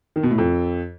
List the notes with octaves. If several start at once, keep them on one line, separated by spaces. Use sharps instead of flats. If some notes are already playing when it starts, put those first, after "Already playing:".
D#3
B2
A2
F2